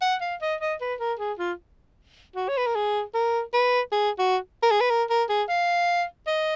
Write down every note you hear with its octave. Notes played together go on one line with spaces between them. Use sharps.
F#5
F5
D#5
D#5
B4
A#4
G#4
F4
F#4
C#5
B4
A#4
G#4
A#4
B4
G#4
F#4
A#4
G#4
B4
A#4
A#4
G#4
F5
D#5